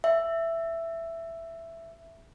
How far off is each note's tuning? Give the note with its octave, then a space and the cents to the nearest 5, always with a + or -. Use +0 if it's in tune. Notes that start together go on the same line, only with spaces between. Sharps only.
E5 +10